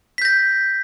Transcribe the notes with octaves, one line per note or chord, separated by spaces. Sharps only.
G6 A#6 B6